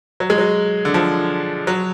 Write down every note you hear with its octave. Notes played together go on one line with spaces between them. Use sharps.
F#3
G#3
F#3
D3
F3
F#3